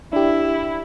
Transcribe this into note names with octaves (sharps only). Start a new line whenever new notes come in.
D4 E4 G4